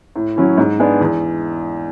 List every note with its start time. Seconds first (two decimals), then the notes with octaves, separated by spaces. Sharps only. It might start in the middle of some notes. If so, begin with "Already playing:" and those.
0.16 A2
0.36 F#3 C#4 E4
0.58 G#2
0.80 G#3 B3 D4
1.01 E2